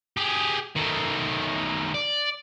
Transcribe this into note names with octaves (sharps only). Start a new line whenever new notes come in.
G4 G#4
D#3 A3
D5